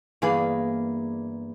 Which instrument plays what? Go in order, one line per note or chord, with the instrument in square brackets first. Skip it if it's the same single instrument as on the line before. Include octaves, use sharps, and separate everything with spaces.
[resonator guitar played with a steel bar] E2 G#4 B4 [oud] G2 A#3 F5